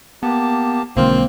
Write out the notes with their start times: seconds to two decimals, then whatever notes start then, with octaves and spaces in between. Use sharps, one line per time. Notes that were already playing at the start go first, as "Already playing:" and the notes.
0.23 A#3 B3 G4 A5
0.97 B1 D3 D#3 G#3 A#3 C4 F4 C5